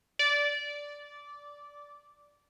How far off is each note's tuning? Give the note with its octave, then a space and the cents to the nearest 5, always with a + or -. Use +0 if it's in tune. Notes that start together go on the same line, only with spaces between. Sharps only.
D5 -15